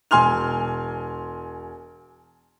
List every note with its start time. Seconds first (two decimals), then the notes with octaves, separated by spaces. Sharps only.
0.11 E1 G#5 C6 F6 F7